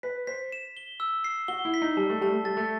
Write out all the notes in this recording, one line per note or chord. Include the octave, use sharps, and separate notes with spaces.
B4 B6
C5 B6
E7
G7
E6
C7
F#4 G7
E4
B6
D#4
G3 A5
A3
G3 A5
A3
G3 A6
A3